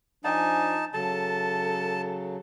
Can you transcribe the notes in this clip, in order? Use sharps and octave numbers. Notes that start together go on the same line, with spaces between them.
F3 D4 D#4 G#5 A5
C#3 F#3 A4 A5